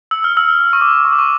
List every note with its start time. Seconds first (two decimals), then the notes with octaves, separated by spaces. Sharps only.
0.11 E6
0.24 F6
0.37 E6
0.73 C#6
0.81 D6
1.05 C#6
1.13 D6
1.19 C#6